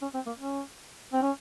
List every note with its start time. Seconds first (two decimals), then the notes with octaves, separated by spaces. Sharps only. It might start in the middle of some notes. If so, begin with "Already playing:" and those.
0.02 C#4
0.14 C4
0.27 A#3
0.39 C#4
1.13 C4
1.22 C#4